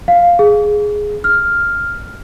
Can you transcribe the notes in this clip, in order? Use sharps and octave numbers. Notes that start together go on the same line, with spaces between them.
F5
G#4
F6